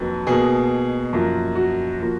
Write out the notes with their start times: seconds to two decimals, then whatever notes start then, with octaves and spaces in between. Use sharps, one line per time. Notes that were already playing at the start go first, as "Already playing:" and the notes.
Already playing: F2 D#3 F#3 A#3 B4
0.27 B2 A#3 G#4
1.13 F#2 F3 A#3
1.55 F#4
2.00 F3 A#3